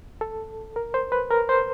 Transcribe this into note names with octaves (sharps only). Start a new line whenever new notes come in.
A4
A#4
C5
B4
A#4
C5